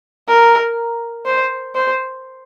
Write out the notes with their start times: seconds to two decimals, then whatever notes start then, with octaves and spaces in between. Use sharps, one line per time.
0.28 A#4
1.26 C5
1.75 C5